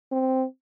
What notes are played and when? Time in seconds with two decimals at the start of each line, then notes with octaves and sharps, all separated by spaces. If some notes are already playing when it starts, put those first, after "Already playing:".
0.12 C4